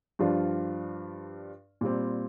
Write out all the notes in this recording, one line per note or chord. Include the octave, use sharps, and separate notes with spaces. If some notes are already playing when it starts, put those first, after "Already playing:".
G2 F3 D4 F4
A#2 G3 C4